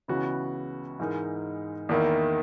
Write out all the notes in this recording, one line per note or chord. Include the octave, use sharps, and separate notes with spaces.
C#2 C#3 E3 B3 F#4
G#2 E3 G#3 D#4 A#4
E2 D#3 A#3 E4